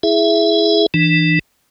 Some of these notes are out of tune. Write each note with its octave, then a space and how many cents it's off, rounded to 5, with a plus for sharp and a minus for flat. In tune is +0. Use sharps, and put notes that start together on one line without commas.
E4 +0 G#4 +5 E5 +15
E3 +0 D4 +35